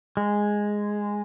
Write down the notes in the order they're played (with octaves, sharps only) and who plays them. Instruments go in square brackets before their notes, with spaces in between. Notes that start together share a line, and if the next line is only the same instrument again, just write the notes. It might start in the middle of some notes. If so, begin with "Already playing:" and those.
[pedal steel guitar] G#3